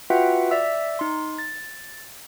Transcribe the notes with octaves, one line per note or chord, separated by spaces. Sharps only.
F4 F#4 B4 E5 F#5 G5
D5 E5 E6
D#4 C6
A6